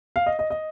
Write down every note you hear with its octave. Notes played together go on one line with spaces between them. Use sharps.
F5
D#5
D#5
D#5